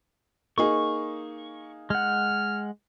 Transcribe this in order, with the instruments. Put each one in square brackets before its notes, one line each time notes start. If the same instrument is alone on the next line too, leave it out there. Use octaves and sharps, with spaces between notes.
[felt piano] A#3 D#4 G#4 [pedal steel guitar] C#6
[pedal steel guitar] G#3 F#5 [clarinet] F6